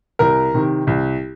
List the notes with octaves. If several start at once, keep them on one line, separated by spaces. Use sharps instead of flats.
C2 A#4
C3 D#3
C2